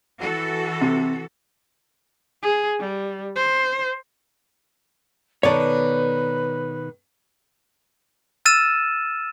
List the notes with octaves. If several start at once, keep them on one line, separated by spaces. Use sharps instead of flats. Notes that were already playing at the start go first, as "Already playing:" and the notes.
E3 F#4 A4
C3
G#4
G3
C5
B2 D#3 A4 B4 C#5 D5
E6 F6 A6 D#7 E7